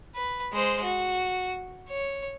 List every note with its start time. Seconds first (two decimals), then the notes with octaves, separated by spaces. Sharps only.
0.15 B4
0.53 G#3 C5
0.84 F#4
1.89 C#5